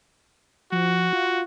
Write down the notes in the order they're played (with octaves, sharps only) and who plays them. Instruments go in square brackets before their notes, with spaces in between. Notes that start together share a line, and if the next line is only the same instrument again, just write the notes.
[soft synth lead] F3 [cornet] F#4
[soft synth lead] F4